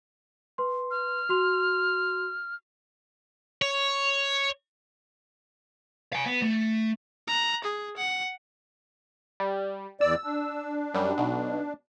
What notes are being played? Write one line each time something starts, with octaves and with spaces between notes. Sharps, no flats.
B4 C6
F6
F#4 C6 F7
C#5
F5 G#5
B3
A3
A#5 F#6
G#4
F#5
G3
E2 D5 E6
D4
F#2 G3
B1 B2